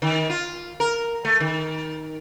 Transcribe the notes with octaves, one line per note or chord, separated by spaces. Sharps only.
D#3
F4
A#4
A3
D#3